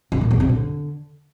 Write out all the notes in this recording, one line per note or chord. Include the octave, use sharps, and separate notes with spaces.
C#3
A#2
E2
C3
D3